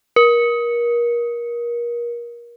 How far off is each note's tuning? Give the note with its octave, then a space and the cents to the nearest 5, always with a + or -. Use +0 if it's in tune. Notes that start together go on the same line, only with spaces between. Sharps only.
A#4 +30